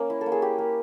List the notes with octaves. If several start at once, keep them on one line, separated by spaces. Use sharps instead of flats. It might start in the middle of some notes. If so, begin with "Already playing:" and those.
Already playing: A#3 C#4
E4
A4
A#3
G#4
E4 G4
A#3